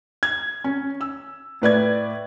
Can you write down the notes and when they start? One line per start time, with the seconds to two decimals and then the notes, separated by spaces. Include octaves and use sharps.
0.23 G#6
0.64 C#4
1.01 E6
1.62 A2 B4 D5 G#6